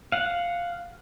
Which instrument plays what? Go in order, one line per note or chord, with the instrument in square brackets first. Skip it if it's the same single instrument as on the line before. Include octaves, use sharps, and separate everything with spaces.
[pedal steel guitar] F5 F#5